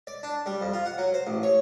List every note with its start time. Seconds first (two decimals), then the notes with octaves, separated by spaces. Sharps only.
0.07 D5
0.23 D4
0.46 G3
0.61 F2
0.74 F4
0.85 F#5
0.98 F#3
1.14 C5
1.27 A1
1.43 C#5